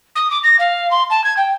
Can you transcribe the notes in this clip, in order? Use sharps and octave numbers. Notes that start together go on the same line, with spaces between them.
D#6
D6
A#6
F5
C6
A5
G#6
G5